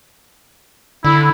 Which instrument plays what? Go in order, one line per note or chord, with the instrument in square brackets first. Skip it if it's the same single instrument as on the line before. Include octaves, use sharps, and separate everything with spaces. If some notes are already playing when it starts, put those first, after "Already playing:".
[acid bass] D3 [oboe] E4